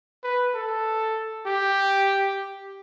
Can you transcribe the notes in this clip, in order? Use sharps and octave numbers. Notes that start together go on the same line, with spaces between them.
B4
A4
G4